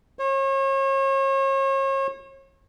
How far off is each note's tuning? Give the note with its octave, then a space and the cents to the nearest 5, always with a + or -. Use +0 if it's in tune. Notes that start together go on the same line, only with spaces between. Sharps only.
C#5 -40